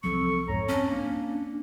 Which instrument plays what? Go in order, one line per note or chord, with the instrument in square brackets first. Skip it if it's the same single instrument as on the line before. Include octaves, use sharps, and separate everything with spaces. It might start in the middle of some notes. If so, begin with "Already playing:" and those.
[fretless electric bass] C2 F3 F#3 [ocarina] C4 [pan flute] A4 [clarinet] C#6
[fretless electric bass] B1 F2 G#2 [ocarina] C#5 [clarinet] A#5
[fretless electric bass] C4 [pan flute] C#4 [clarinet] A5
[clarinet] A#3 [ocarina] D4